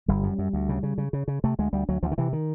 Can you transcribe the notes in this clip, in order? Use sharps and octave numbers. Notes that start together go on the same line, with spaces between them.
G1 G3
F#2
F#2
D2
C#3
C#3
C#3
C#3
C#3
C3 A3
D2 G#3
D2 G3
D2 F#3
D2 F3
D#3
C3 E3
D#3